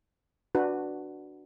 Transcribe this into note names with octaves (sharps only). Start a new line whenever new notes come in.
D4 F#4 B4